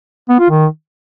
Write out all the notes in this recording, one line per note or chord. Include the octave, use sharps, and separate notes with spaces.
B3
F4
D#3